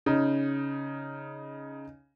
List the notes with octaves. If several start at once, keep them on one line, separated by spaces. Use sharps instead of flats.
C#3 D#4